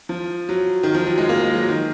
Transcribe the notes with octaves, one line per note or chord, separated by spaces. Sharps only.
F3
F#3
D#3
F3
F#3
G#3
A#3
G#3
F#3
D#3